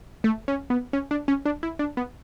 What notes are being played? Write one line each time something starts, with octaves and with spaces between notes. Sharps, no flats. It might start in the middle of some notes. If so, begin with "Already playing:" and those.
A3
C#4
B3
C#4
D4
C#4
D4
E4
D4
B3